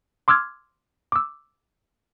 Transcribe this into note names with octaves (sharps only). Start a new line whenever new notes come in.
C6 D6 E6 F6 G#6
D6 E6